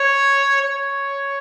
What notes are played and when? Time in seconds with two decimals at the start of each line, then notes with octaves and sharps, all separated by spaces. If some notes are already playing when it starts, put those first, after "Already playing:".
Already playing: C#5
0.62 C#5